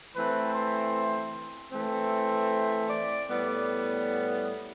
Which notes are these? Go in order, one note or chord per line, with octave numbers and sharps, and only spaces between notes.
E3 A3 C4 B4
C5
E3 A3 C4
D5
A2 G3 B3 D5